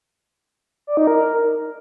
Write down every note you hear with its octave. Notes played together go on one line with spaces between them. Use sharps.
D5
D#4
A#4